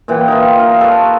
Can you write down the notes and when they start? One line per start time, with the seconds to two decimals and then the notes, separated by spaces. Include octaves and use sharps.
0.08 A#2 E3 F#5 G5
0.28 D#4 F4
0.59 A#4
0.81 A4 B4 C#5